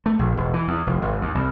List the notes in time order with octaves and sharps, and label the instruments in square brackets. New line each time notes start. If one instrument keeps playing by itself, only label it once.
[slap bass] A3
A#1
E1
E3
E2
F1
G#1
D#2
C2